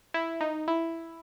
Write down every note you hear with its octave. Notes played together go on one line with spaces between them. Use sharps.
E4
D#4
E4